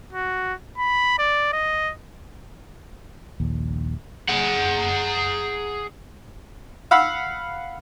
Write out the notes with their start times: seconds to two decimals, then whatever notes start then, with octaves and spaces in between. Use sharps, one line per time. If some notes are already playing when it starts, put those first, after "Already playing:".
0.13 F#4
0.78 B5
1.19 D5
1.53 D#5
3.40 D#1 A#1 D#2
4.29 G#4 F#5
6.91 F5 F#5 B5 E6